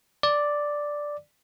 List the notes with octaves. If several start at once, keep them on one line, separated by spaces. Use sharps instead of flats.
D5